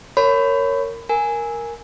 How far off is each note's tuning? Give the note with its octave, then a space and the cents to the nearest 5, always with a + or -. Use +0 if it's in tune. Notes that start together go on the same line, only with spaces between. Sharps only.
A#4 -15 C#5 +0 B5 +25
A#4 +0 G#5 +0